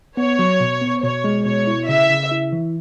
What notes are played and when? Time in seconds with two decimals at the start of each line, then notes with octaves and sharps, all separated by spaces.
0.17 B3 C#5
0.39 F#3
0.60 B2
0.81 B3
1.03 B2 C#5
1.24 G#3
1.45 B2 C#5
1.67 E4
1.88 C#3 E5
2.10 C#3
2.31 E4
2.52 E3